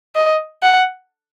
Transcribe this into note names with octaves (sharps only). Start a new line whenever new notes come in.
D#5
F#5